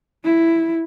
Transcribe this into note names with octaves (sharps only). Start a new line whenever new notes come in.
E4